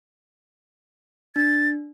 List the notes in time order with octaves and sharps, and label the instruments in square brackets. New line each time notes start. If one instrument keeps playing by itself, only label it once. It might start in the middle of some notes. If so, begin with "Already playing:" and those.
[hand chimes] D4 [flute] A6